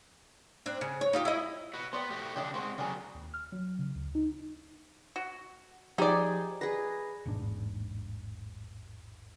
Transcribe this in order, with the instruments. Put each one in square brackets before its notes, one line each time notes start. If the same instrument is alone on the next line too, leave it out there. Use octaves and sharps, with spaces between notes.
[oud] C4 D4
C#3
C#5
D#4 F4 G4
E4 D#5
[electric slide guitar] F#4 B4
[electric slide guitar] B3 [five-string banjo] C5 D5 G5
[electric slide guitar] A3 F#4 G4
[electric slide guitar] C#3 D4 [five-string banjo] G4 D#5 F5
[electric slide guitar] G#3 C4 [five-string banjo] F#4 C5 F#5
[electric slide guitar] C#3 F#3 [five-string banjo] G3 D4 G#4
[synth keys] D#2
F6
F#3
C#3
D2
D#4
[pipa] F#4
[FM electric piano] F3 C5 G#6 [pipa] D#4 D5 [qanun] G4 G#4 G#5
[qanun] G#4 B4 [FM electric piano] A#6
[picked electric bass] E1 A1 G#2 D4